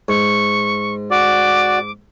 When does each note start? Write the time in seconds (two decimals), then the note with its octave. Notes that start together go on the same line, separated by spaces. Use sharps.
0.09 G#2 C#6
1.11 F#4 D5 D6